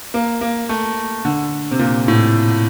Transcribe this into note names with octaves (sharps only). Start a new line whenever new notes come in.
A#3
A#3
A3
D3
C3
A#2
A2